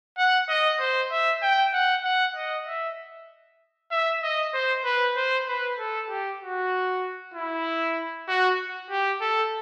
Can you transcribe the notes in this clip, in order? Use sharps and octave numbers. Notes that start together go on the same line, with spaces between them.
F#5
D#5
C5
E5
G5
F#5
F#5
D#5
E5
E5
D#5
C5
B4
C5
B4
A4
G4
F#4
E4
F#4
G4
A4